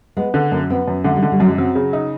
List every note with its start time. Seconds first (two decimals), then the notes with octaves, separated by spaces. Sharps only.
0.17 G#3 B3
0.34 D3
0.52 F#2 A#3
0.70 B3 C4
0.88 F#2
1.04 D3 A3
1.16 G3
1.23 D3 G#3
1.32 G3
1.40 F#2 F#3
1.49 G#3
1.58 F#3 C4
1.75 C#3
1.93 D#4